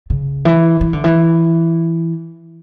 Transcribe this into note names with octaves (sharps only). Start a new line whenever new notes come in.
C#3
E3
E3
D3
E3